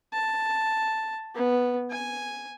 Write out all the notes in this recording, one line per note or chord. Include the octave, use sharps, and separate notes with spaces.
A5
B3
G#5